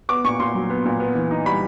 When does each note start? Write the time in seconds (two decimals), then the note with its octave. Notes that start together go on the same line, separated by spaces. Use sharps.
0.09 B3 D6
0.24 A#2 C#6
0.39 A#2 C6
0.54 F#3
0.70 B3
0.85 A#2
1.00 B3
1.15 E3
1.31 D#4
1.46 G3 B5